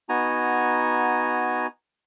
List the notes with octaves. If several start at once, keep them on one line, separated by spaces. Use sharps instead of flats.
B3 D#4 F#4 G#5 A#5